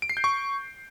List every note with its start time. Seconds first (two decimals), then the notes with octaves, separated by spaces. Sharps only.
0.02 D7
0.09 C7
0.17 G6
0.24 C#6